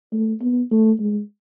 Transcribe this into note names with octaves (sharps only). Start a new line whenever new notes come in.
A3
B3
A3
G#3